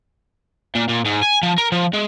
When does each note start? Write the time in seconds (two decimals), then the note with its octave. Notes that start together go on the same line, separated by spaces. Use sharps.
0.75 A#2
0.89 A#2
1.05 G#2
1.23 G#5
1.43 F3
1.58 A#4
1.72 F3
1.93 G#3